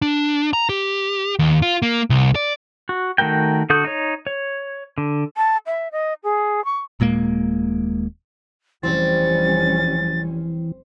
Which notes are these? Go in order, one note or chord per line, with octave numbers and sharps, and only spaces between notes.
D4
A#5
G4
D#2
F4
A#3
C2
D5
F#4
D#3 A3 F#4 A#4 G5
D3 F#4 A4 D#6 G6
D#4 C#5
C#5
D3
A5
E5
D#5
G#4
C#6
D#1 A#2 G#3 A#3
F1 E3 G3 C4 C#4 A6